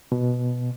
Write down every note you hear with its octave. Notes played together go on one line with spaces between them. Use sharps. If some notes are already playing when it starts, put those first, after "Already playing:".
B2